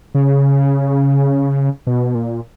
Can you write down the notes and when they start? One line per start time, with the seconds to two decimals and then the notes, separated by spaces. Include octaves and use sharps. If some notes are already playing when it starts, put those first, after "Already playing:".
0.15 C#3
1.87 B2
2.15 A#2